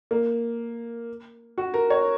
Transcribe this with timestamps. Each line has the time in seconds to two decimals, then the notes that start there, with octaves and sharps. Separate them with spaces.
0.11 A#3
1.58 F#4
1.74 A#4
1.90 C#5